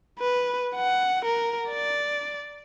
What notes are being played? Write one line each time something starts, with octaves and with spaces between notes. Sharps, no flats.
B4
F#5
A#4
D5